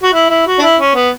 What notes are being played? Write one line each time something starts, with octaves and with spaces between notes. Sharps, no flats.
F#4
E4
E4
F#4
D4
E4
C#4
B3